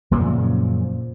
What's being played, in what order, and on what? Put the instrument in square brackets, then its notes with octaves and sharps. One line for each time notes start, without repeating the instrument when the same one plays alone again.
[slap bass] F#2 A#2 C#3 F3